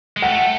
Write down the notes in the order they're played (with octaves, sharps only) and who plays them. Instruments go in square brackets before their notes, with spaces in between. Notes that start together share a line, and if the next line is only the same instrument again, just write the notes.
[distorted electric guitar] G#3
[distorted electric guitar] A3 [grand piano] F#5